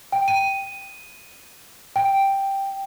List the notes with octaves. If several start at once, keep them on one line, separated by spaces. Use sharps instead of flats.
G5
D#7
G5